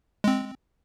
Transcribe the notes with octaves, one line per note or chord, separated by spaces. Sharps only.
G#3 C4